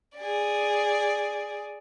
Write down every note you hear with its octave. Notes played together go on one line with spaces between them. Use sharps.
G#4 D5